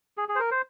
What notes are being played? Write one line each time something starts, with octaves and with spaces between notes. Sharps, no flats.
G#4
G#4
C5
A#4
C5